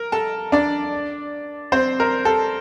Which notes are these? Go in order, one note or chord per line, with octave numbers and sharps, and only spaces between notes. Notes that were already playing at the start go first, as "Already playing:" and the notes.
Already playing: A#4
A4 A5
D4 D5
C4 C5
A#4
A4